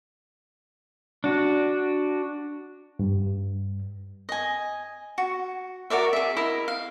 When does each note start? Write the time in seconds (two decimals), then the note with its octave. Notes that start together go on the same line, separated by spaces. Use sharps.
1.24 D4 F#4
2.99 G2
4.29 D#5 G#5
5.18 F#4
5.90 F#4 A#4 D5 E5
6.13 G#4 E5
6.37 E4 A#4 D#5
6.68 F5